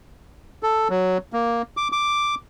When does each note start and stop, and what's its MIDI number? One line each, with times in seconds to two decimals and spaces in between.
0.63 0.88 69
0.90 1.18 54
1.33 1.62 58
1.77 1.88 86
1.92 2.35 86